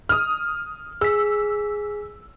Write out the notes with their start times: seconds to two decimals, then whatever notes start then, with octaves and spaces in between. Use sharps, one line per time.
0.09 D#6 F6
1.01 G#4 E6 B6